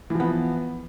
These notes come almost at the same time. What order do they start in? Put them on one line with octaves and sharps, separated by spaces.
E3 F3 B3